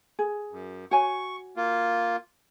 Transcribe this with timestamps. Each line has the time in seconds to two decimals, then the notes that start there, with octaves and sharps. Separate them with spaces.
0.19 G#4
0.51 F#2
0.91 F#4 C#5 G#5 C#6
1.57 A#3 F4